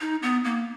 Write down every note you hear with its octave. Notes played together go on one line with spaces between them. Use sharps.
D#4
B3
A#3